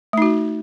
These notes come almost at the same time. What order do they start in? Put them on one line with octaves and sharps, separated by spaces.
A3 D#4 F#4